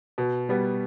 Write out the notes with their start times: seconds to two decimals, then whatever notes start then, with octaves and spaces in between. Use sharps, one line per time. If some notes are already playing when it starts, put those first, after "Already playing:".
0.18 B2
0.49 G3 B3